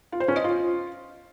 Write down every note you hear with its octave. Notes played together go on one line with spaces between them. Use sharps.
F4
C5
C#4
D#5
F4